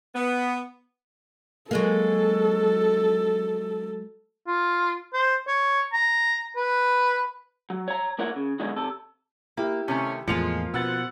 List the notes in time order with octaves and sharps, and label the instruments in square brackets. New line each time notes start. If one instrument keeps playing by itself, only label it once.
[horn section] B3
[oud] F#3 G#3 A#3 [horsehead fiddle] A4
[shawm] F4
C5
C#5
A#5
B4
[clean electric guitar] F#3
C#5 A#5
A#3 E4 A#4 C#5 F#5
C#3
G#2 B2 D3 D#3 F#3 G#3
C3 A4
[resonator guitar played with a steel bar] A#3 [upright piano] E4 G4
[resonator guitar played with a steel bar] C3 D#3 A3 [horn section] C#4
[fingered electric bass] E2 A2 [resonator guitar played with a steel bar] F3 A#3 F4 [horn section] G#3 [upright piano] C#7 F7
[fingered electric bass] B2 [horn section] B3 C5 F#5 [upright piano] E6 A6